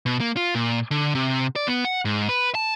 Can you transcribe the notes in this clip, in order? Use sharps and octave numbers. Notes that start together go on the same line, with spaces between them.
B2
A#3
F4
A#2
D3
C3
D5
B3
F#5
G#2
B4
A5